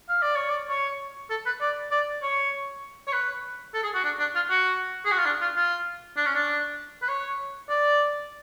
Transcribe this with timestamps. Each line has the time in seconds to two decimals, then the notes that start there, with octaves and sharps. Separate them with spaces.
0.09 F5
0.22 D5
0.36 C#5
0.49 D5
0.69 C#5
1.30 A4
1.46 B4
1.60 D5
1.91 D5
2.22 C#5
3.07 C#5
3.12 B4
3.73 A4
3.83 G#4
3.94 F#4
4.04 D4
4.19 D4
4.35 F4
4.50 F#4
5.05 G#4
5.11 F#4
5.18 F4
5.25 D4
5.41 F4
5.56 F4
6.16 D4
6.25 C#4
6.35 D4
7.02 B4
7.08 C#5
7.69 D5